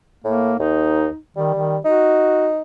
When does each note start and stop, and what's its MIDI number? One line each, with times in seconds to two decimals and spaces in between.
0.24 0.53 45
0.24 0.56 58
0.59 1.07 39
0.59 1.17 63
1.36 1.55 51
1.36 1.78 55
1.55 1.78 51
1.84 2.62 63
1.84 2.50 66